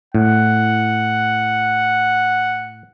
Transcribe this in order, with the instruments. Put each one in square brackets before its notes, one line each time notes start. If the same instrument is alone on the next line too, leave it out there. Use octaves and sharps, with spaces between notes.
[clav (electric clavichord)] A2 [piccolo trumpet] F#5